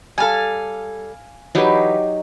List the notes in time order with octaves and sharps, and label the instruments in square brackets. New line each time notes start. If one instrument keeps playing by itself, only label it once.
[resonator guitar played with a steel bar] G3 A4 [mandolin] F5 G#5
[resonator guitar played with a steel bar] E3 B4 [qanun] F#3 D#4 G4